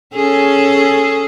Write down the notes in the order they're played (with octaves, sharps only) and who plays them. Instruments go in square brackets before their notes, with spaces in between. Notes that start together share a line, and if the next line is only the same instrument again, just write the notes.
[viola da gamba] C#4 G#4 A4